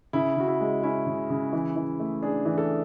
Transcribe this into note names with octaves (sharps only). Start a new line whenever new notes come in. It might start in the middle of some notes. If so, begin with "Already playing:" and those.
C#3 E4
C#3 F#4
E4
G#3
C#4 E4
C#3
C#3
E3
E3
A3
D4 G#4
E3
A4